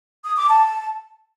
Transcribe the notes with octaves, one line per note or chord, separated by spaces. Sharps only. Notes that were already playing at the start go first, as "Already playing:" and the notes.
D#6
D6
A5